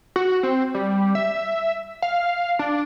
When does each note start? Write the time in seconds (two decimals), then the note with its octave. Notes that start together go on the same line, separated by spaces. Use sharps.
0.16 F#4
0.43 C4
0.74 G3
1.15 E5
2.02 F5
2.59 D4